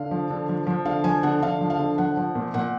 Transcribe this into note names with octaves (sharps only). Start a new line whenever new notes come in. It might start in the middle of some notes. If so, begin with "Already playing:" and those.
Already playing: D3 F5
F3
D3
F3
F3
D3 F5
F3 G#5
D3 F#5
D3 F5
F3
F5
D3
F3 F#5
F3
A#2
A#2 F#5